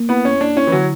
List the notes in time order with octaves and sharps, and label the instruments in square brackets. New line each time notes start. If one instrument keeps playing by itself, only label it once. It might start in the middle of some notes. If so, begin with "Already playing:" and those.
Already playing: [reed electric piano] A#3
[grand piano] B3 [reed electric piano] E4
[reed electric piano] E2 [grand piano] C#4
[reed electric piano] A#3 [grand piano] D4
[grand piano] C#4 [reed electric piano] E4
[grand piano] E3
[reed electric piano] D3 [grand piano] F#3